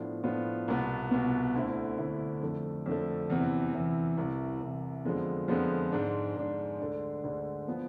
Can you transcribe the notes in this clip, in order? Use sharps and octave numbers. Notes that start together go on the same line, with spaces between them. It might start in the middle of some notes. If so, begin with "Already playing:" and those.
Already playing: A2 F3 B3 D4 F4
A2 F3 B3 D4 F4
C2 B2 B3
C2 B2 B3
D2 D3 A3 C4 E4
D2 D3 A3 C4 E4
F2 D3 A3
F2 D3 A3
E2 C3 E3
E2 C3 E3
C2 C3 E3
C2 C3 E3
F2 D3 F3 G#3 B3
F2 D3 F3 G#3 B3
G#2 G#3 D4
G#2 G#3 D4
D2 D3 G#3 D4
D2 D3 G#3 D4
F3 B3